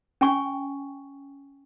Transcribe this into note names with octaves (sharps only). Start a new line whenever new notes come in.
C#4 G5 G#5 C#6